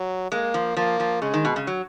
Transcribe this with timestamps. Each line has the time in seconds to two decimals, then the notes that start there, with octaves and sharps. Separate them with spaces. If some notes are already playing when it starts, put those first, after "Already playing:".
Already playing: F#3
0.32 G#3 A#3
0.54 F3
0.77 F3 A#3
1.00 F3
1.22 C#3 G#3
1.34 D#3
1.45 B2
1.56 C#3
1.67 F#3